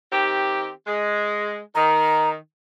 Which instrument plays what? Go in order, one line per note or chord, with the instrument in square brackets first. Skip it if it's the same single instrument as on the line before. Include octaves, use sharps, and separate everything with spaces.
[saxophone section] D#3 C4 G4
G#3
[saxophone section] D#3 [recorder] A#5